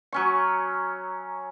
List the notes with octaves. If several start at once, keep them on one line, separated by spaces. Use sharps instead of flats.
F#3 C#4 C#6